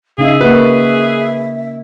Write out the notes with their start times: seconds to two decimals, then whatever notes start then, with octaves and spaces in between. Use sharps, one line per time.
0.18 C#3 D#4 G#4 E5 F5
0.41 A#3 F#4 B4 E5